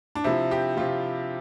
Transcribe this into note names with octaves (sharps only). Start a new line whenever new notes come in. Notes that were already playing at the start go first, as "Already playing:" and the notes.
D4
C3 F3 E4
G4
C3 F3 F4